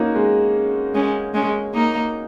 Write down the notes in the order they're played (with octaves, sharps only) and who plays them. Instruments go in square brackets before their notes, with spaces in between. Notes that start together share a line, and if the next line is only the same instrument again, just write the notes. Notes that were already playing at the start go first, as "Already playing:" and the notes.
Already playing: [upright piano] A#3 C#4 D#4 F#4
G#3
[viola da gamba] G#3 C#4
G#3 C#4
A#3 D#4